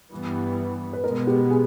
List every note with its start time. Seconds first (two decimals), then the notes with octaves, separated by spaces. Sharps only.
0.11 G2 E3 G3 B3
0.93 B4
1.04 B2 G#3 B3 A#4
1.27 G4
1.50 G#4